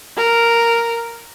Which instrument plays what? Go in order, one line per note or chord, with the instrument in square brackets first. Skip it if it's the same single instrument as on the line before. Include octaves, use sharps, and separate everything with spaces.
[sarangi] A#4